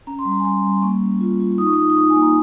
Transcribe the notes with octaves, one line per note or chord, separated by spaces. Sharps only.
C#4 A#5
C6
G3
A#5
G#5
G3 A#5
G3
A#3 C#6
C#4
F4
F4
D#4 D#6
C#6
D#4 D#6
D#6
D#4 C#6
G#5
A#3
A#5